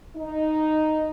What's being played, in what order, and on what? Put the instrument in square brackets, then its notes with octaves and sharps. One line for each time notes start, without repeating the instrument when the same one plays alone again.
[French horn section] D#4